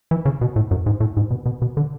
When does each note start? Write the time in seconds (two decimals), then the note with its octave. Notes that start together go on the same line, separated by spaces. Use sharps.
0.11 E3
0.26 C#3
0.41 B2
0.56 A2
0.71 F#2
0.86 G#2
1.01 A2
1.17 G#2
1.31 B2
1.46 B2
1.62 B2
1.77 D3